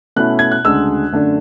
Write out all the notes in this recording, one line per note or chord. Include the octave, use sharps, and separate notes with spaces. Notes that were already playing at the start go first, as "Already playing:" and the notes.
B2 A3 C#4 E4 F#6
G#6
F#6
D2 C#3 G#3 D4 E6
F#2 D3 A3 D4